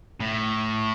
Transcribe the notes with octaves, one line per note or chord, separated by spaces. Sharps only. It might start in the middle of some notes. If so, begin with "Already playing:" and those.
A2